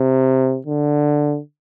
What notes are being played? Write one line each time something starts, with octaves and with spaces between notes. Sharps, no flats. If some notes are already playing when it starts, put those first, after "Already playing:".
Already playing: C3
D3